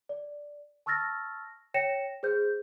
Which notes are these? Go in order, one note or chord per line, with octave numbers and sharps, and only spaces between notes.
D5
A5 C#6 E6 F6 A6 A#6
C#5 G5 A#6 C#7 E7
G#4 C5 G6